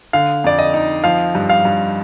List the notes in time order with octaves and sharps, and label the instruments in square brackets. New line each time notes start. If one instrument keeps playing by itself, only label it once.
[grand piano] D3 F5
F2 D5
D#5
D#4
F3 F5
G2
F5
G2